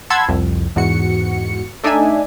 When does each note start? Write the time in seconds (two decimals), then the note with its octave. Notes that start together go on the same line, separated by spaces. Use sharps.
0.10 F#5 A5 B5 C6 E6 G#6
0.28 C2 F2
0.76 E2 G#2 F#4 C#7
1.84 A3 D4 D#4 D5 E5 G#5